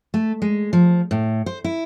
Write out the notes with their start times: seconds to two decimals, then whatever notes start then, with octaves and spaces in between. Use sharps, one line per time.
0.14 A3
0.42 G#3
0.73 F3
1.11 A2
1.46 C5
1.64 E4